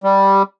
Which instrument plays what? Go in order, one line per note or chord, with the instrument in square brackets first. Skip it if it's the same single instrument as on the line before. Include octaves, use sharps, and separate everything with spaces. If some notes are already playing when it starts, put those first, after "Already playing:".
[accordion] G3